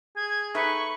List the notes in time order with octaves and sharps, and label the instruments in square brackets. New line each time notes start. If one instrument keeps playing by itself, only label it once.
[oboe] G#4 [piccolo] G#6
[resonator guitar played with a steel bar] D#4 A4 E5 [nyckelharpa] B4 [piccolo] C#6